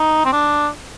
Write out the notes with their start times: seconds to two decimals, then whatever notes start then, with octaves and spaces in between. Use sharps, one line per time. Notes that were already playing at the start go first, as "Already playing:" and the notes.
Already playing: D#4
0.25 C4
0.33 D4